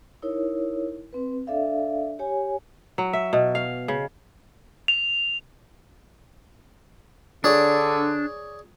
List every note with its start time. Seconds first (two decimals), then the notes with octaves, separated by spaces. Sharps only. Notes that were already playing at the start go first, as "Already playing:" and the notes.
0.22 D#4 E4 A#4 C#5
1.13 C4 B4
1.47 D4 A4 D5 E5 F5
2.19 G4 C#5 G#5
2.98 F#3
3.13 E5
3.33 B2
3.55 F5
3.88 C#3
4.88 F7
7.44 D3 D4 G#4 C#5 D5